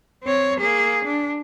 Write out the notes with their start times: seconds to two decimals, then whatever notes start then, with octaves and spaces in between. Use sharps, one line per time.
0.24 C4 C#5
0.60 A#3 G#4
1.06 D4